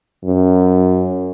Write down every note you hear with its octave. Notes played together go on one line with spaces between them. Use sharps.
F#2